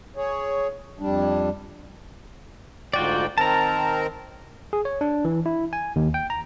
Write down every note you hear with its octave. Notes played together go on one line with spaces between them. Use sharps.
G#4 C#5
F2 G3 D4
D2 G#2 F4 F#4 D5 G5
D#3 C4 A#4 A5 A#5
G#4
C#5
D4
E3
E4
G#5
D#2
G5
A#5